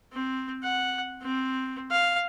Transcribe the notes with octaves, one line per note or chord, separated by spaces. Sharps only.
C4
F#5
C4
F5